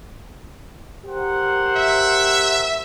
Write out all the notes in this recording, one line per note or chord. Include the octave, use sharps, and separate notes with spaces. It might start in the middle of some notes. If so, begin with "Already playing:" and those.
G4 A#4 C5 F#5
E5